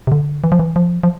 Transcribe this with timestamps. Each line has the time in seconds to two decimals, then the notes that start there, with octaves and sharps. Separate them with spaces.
0.07 C3
0.12 D3
0.44 E3
0.52 F3
0.59 E3
0.76 F3
1.03 F3